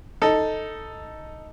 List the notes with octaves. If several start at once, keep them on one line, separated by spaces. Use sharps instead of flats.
D#4 A4